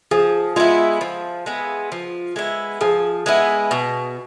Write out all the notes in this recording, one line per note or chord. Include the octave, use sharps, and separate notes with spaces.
F3 G#4
G#3 B3 E4 F4
F3
G#3 B3 E4
F3
G#3 B3 E4
F3 G#4
G#3 B3 E4
B2